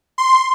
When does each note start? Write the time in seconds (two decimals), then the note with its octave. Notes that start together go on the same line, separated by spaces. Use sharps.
0.18 C6